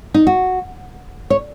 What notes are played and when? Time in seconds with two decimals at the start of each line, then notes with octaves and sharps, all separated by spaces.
0.14 D#4
0.27 F#4
1.30 C#5